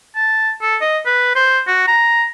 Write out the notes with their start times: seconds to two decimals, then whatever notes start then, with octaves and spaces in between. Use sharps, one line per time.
0.15 A5
0.62 A4
0.81 D#5
1.06 B4
1.35 C5
1.67 F#4
1.88 A#5